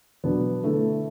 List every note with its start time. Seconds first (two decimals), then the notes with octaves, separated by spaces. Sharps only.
0.24 B2 F#3 B3 D4
0.63 D3 A3 E4 A4